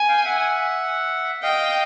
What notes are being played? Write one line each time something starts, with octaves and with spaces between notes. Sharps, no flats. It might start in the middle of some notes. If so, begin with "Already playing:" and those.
Already playing: G#5
F5 G5
E5 F#5
D#5 F5 G5